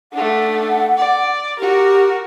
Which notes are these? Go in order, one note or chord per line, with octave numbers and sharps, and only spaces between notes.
A3 D4 F#5
D5
F#4 G4 A#4